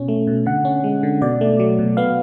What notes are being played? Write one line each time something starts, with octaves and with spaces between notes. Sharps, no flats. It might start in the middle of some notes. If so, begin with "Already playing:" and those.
Already playing: B2 C#4
A3
B2
D3 F#5
C#4
G#3
D3
B2 D5
A3
F#3
B2
B3 F5